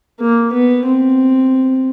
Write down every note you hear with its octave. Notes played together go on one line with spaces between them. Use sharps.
A#3
B3
C4